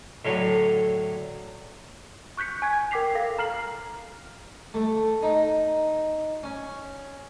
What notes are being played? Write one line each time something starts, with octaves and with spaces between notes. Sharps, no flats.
A2 D3 F#3
C#6 F#6 G6 B6 C#7
G#5 G#6
A#4 G5 D6 B6 C7 F7
A4 F5 A#6
A#5 F6 C7 F#7
A3
D#4
C#4